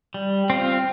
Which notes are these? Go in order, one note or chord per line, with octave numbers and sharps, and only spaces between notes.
G3
C4 F4